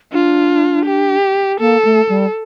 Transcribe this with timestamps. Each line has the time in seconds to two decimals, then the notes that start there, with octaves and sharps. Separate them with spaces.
0.13 D4 F4
0.86 G4
1.60 A#3 A4
1.84 A3
2.09 G3